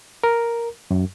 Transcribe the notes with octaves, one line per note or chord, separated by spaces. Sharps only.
A#4
F#2